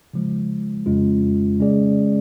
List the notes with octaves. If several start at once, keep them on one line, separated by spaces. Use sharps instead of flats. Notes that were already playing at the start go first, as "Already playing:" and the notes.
C#3 F3 G#3
F2 C#3 G#3 C#4 F4
C#3 G#3 C#4 G#4 D5